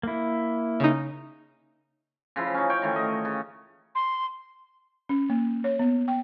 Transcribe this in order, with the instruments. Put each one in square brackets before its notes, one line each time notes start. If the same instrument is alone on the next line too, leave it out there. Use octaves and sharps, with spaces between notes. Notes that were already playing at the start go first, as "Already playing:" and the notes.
[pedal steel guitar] A#3 E4
[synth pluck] C#3 D#4
[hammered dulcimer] C#3 F3 E4
C#4 D#4
C#5 G5
D#3 E3 A3
D#5
C#3
[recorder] C6
[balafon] C#4
A#3
C#5
B3
G5